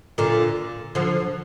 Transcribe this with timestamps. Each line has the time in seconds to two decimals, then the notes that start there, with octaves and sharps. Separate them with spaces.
0.18 A#2 D3
0.95 D3 F3